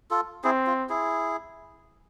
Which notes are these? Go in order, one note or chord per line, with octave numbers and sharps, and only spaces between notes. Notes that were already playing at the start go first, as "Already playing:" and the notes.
F4 A4
C4 E4 G#4
F4
E4 G#4